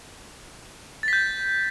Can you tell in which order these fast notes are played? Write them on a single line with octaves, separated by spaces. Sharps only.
A6 B6 G6